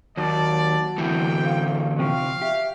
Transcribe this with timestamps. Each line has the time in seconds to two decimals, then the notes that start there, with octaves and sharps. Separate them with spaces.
0.18 D#2 F#3 D5 A5
0.98 D2 E3 G5
1.45 F5
1.99 C3 F3 G4 F5 C#6
2.42 G4 E5